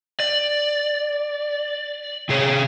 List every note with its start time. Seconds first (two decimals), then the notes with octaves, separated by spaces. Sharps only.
0.20 D5
2.29 C3 G#4 C#5